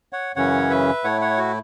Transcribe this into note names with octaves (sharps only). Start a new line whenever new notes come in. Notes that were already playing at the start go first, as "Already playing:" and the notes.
C#5 F#5
F#2 C#3 E3 C#4 C#5 F#5
B4 E5
A2 A3 E4 C#5 F#5
C#5 F#5
F#4